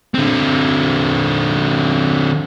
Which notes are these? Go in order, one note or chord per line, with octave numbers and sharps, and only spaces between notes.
D3 C4